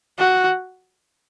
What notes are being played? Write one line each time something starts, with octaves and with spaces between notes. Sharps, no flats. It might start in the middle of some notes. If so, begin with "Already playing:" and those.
F#4